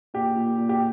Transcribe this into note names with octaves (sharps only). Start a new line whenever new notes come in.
A#2 G4
A#2
A#2
G4